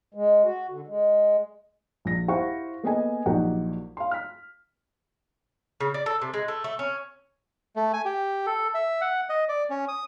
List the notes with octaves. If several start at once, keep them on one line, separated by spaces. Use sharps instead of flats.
G#3
F#4
D3
G#3
A#1 A#6
E4 G4 C5 F5 F#5 C#6
A#3 B3 G#4 A4 D#5 G#5
A#1 F#3 A#3 D#4 G4 F#5
F5 C6
F6 B6
C#3
D5
A4
C3
G#3
A3
A3
C#4
A3
G#5
G4
A4
E5
F#5
D#5
D5
C#4
D#6